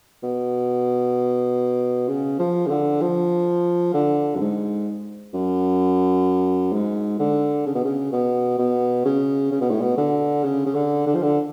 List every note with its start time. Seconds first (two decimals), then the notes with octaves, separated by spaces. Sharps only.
0.23 B2
2.08 C#3
2.39 F3
2.66 C#3
2.70 D3
3.01 F3
3.94 D3
4.35 F#2
4.41 G#2
5.33 F#2
6.73 G#2
7.19 D3
7.66 C#3
7.75 B2
7.85 C#3
8.12 B2
8.58 B2
9.05 C#3
9.51 C#3
9.61 B2
9.71 A2
9.81 B2
9.98 D3
10.44 C#3
10.66 C#3
10.75 D3
11.06 D3
11.15 F3
11.23 D3